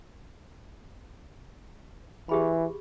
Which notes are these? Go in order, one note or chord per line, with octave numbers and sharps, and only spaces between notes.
E3 G4 G#4 B5